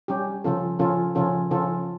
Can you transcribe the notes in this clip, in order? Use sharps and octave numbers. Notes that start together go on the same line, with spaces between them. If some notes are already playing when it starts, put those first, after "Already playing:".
G3 C#4 G4
C#3 F3 C#4 F4 A4
C#3 F3 C#4 F4 A4
C#3 F3 C#4 F4 A4
C#3 F3 C#4 F4 A4